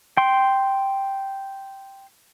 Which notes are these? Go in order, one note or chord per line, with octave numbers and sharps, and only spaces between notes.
G5 C6